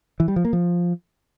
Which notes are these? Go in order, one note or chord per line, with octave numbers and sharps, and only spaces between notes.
E3
G3
F3
A#3
F3